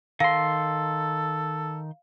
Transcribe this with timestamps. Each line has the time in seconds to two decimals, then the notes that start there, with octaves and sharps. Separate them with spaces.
0.20 D#3 A4 F5 C6